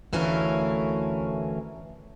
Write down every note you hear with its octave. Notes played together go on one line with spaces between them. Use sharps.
D2 E3 A3 C#4 A#4 F5